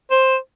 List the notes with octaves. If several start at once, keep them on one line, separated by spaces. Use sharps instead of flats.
C5